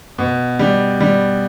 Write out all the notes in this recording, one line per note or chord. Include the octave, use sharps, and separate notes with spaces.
B2
G3
G3